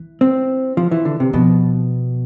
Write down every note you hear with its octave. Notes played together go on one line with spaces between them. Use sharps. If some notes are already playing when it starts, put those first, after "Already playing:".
Already playing: E3
C4
F3
E3
D3
C3
B2 F3